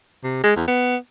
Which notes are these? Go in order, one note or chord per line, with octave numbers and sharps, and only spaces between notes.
C3
G#3
E2
B3